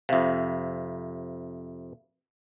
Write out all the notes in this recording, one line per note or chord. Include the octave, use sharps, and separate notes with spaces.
F2 C3 E5 F5